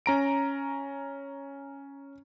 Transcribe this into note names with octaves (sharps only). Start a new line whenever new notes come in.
C#4 A#5 D7